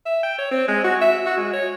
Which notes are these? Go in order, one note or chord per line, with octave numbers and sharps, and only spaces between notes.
E5
G5
C#5
C4
G#3
F#4
E5
F#4
G#3
C#5